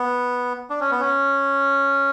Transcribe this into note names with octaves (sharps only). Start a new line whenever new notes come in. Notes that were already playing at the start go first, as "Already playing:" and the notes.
Already playing: B3
D4
C#4
B3
C#4